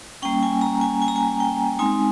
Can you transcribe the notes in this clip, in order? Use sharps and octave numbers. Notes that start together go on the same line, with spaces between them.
G3 A#3 C#4 G5
G#5
A#5
G#5
G#5
A#5
G#5
G5
G#3 C4 D#4 G#5